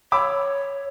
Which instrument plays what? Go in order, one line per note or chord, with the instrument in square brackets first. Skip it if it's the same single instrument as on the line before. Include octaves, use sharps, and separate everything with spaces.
[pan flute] C#5 [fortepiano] B5 D6 E6